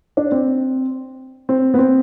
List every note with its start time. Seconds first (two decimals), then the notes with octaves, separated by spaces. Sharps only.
0.17 D4
0.32 C4
1.49 C4
1.74 B3
1.79 C4